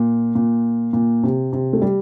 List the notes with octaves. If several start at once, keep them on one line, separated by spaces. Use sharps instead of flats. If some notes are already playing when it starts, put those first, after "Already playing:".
Already playing: A#2
A#2
A#2
C3
C3
A3
G3